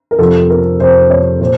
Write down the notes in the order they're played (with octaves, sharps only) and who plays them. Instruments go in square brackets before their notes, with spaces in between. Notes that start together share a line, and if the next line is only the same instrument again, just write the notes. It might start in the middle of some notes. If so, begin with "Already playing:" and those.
[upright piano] A#4
F2 C3 F3 A4
A#4
F2 C3 F3 C5
C#5
A#2 C5